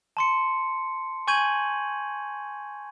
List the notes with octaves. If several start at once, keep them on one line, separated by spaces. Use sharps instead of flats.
A5 C6 C#7
G#5 C#6 G6 G#6 D#7 F#7